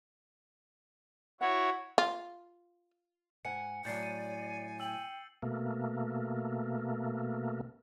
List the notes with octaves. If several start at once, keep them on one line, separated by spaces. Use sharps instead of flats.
E4 F#4 C#5 F#5
F4
G#2 F#5 G#5 C#7
A2 F#3 D5 G#5 G6 A6 C7
C7 D#7
G5 E6 F#7
B2 A3 A#3